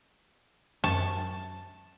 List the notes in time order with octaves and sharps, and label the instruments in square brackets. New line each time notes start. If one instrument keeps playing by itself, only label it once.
[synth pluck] F#2 C#6 [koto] A5